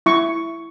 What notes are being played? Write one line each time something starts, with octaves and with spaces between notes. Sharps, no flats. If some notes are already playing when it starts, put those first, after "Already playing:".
E4 C#6